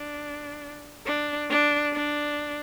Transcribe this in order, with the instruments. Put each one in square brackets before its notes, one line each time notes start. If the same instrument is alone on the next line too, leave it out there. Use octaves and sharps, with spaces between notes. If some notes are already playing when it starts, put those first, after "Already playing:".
Already playing: [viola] D4
D4
D4
D4